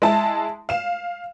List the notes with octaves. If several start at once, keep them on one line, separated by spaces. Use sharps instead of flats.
G#3 E4 A5
F5 E7